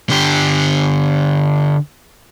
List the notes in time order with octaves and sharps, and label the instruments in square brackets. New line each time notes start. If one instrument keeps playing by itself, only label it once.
[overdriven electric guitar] D3 G4